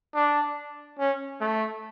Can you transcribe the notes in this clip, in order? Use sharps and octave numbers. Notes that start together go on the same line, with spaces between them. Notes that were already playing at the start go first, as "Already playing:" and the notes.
D4
C#4
A3